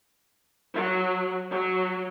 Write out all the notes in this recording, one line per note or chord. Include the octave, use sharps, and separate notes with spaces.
F#3
F#3